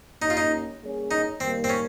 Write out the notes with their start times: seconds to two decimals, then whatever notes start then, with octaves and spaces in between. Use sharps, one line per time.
0.22 A#3 C#4 D#4 G4
0.30 F4
0.37 D#4
0.81 G3 A#3 C#4 G#4 C#5
1.11 D#4
1.40 D#3 G3 A#3 C4
1.64 C4
1.69 C#4